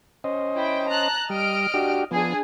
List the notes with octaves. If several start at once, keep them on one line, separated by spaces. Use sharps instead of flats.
C#4 C5 D#5
E4 G5
A5 A#5 F#6
G3 D#5 F6 D7
D4 F#4 G4
F3 B3 D4 G#4